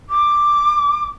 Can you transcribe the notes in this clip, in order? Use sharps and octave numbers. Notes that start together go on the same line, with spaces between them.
D6